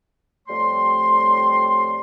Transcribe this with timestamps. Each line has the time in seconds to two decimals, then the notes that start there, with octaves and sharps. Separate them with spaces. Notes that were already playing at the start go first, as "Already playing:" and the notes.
0.47 F2 G3 A3 C#5 C6